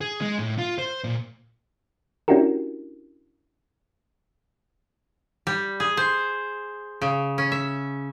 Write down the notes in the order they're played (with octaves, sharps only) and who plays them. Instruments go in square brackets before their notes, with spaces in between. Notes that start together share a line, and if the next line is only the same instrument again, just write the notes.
[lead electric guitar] G#4
G#3
A2
F4
C5
A#2
[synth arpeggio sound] C#4 D4 E4 F#4 G4 A#4
[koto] G3
G#4
C5
C#3
C#4
E5